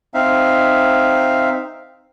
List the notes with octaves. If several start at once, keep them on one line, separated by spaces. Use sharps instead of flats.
C4 D#4 E5 F5